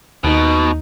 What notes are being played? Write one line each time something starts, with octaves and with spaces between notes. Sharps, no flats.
D#2 B2 D#4